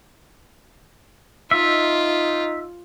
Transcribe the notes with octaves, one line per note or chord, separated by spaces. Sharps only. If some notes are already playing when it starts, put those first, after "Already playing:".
D#4 F4 E5